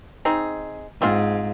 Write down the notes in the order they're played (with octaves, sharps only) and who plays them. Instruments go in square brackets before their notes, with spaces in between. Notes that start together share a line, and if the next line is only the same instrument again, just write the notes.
[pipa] C4 D#4 G#4
[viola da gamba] G#2 [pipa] C4 F4 G#4